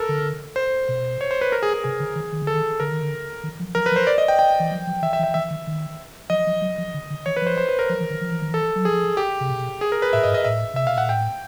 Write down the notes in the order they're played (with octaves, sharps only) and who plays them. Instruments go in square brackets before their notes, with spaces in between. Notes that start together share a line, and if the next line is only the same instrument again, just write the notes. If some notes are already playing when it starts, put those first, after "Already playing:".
Already playing: [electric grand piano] A4 A#4
[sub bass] D3
[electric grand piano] C5
[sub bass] B2
[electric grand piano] C#5
C5
B4
A#4
G#4
G#4
[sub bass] C3 [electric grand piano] G#4
[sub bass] D3
D#3
D#3
D3
[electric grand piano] A4
[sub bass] D#3
[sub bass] D3 [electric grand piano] A#4
[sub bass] D#3
D3
D#3
F3
[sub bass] F3 [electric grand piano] A#4
[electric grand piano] B4
[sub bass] F3
[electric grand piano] C5
D5
D#5
G5
G5
[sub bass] E3
F3
F3
[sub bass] E3 [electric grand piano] E5
[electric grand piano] E5
[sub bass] E3
[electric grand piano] E5
[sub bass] E3 [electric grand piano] E5
[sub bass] D#3
D#3
[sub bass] F3 [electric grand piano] D#5
[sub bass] F3
F#3
F3
D3
D3
[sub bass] E3 [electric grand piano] C#5
[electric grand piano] B4
[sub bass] F3 [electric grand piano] C5
[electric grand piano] C5
B4
A#4
[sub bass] F3
E3
D#3
F3
E3
D#3
[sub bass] E3 [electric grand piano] A4
[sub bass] F#3
[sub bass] F3 [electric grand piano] G#4
[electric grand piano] G4
[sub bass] C3
B2
[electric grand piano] G#4
A#4
B4
[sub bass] A2 [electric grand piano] E5
[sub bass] G2 [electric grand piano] D#5
[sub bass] G#2
[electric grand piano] D#5
[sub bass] A2 [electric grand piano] E5
[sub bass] C3 [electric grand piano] E5
[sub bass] B2 [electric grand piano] F5
[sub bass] A#2 [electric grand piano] F#5
[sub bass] A2 [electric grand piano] G5